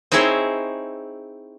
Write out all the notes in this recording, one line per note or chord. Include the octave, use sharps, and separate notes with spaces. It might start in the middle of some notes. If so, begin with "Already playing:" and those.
C4 D#4 E4 G#4 C5 C#5